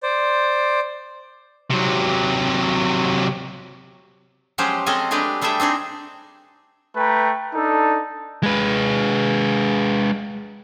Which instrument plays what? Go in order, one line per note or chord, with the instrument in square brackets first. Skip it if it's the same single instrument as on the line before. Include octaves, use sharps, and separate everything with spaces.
[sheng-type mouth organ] C5 D5
[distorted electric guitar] C3 F#3
[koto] F3 F#3 G#3 C#4 G4 C5
G#3 C4 C#4 A4 D#5 G#5
F#3 G#3 A3 D4 G4 B4
G3 A3 G#4 A4 E5 G5
C4 D4 D#4 G#4
[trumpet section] A3 B4 G5 A#5
D4 D#4 A4
[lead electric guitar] G#3 B4